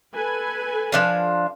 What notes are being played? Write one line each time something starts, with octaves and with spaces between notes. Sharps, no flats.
A4 B4 G#5
F3 D4 F5